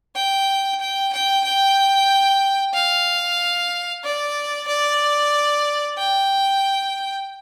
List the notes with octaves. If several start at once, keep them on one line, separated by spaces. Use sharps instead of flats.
G5
G5
G5
G5
F5
D5
D5
G5